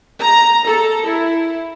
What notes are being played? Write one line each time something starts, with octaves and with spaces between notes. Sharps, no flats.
A#5
A4
E4